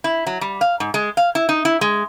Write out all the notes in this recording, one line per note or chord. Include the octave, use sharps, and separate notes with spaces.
E4
F#3
G3
F5
G#2
G#3
F5
E4
D#4
E4
G#3